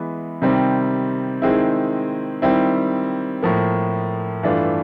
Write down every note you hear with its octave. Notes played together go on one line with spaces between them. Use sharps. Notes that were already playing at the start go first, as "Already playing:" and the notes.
Already playing: E3 G#3 B3
C3 D#3 G3 C4
D#3 G#3 C4 E4
D#3 G3 C4 E4
A2 F3 A#3
G2 E3 A3 D4 F4